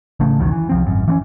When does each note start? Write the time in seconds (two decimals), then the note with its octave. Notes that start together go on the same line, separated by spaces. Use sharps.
0.20 A1 C#3 A3
0.39 B1 E2 D#3 F#3
0.52 E3
0.69 C2 F3 C4
0.86 G#1 F#2
1.08 E3 B3 C#4